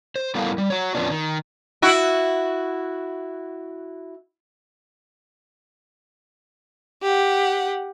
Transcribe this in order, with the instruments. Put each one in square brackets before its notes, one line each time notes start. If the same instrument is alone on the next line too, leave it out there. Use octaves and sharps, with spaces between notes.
[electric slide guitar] C5
G3 B3 E4 A4 A#4 F5
G3
F#4 C#5
F2 F3 G3 B3 C#4 D4
D#3
[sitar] E4 F#4
[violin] G4 F#5